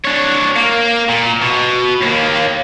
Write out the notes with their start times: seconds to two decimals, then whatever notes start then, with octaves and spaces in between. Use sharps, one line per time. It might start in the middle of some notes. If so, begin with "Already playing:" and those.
0.05 D4 C#5
0.56 A#3
1.09 A#2
1.42 B2
2.01 D#2 A#3